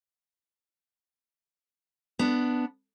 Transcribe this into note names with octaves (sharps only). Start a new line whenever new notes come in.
B3 D4